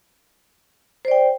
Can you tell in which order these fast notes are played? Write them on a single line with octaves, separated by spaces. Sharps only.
C5 D5 G5